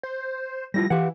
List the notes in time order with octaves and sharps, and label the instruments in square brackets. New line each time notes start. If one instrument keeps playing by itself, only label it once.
[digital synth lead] C5
[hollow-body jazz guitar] G3 E4 F4 [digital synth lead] A#6
[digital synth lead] E3 [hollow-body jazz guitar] G4 F5 F#5